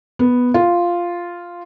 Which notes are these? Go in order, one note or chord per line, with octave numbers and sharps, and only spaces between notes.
B3
F4